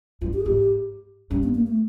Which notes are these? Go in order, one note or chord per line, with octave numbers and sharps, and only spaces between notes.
G2 F4
G4
G#4
G#2 G4
G2 C#4
B3
A#3
A3